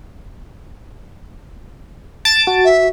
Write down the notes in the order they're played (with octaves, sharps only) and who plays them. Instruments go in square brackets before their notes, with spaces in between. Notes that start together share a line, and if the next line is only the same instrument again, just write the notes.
[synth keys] A5 A6 D7
[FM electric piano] F#4
[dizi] E5